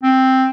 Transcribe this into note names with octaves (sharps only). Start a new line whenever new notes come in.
C4